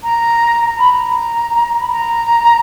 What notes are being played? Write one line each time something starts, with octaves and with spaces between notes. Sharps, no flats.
A#5
A#5
B5
A#5
B5
A#5